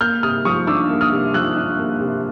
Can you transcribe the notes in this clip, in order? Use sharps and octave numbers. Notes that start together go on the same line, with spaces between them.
A#3 F6 G6
C3 D#6 F6
F3 C#6 D#6
D4 D6 E6
A#3
D#6 F6
C3
F3 E6 F#6
D4
A#3
C3